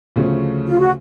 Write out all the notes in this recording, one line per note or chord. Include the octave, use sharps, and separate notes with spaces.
D2 C#3 F3 A3 C#4
F4
F#4